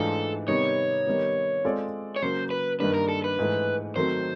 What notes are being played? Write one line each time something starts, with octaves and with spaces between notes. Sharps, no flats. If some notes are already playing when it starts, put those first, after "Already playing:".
Already playing: G#2 E3 A3 D4 F4 A4
C3 D#3 G3 B3 D#4 C#5
D#3 G3 B3 D#4
G#3 C4 F4 A4 D5
C#5
C#3 F#3 A#3 C5
B4
G2 D#3 G3 A#3 D4 B4
A#4
A4
B4
G#2 E3 A3
D#3 F#3 A3 C4 C5